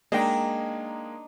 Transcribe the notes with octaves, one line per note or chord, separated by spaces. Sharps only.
G#3 A#3 D4 D#4 D#5 G5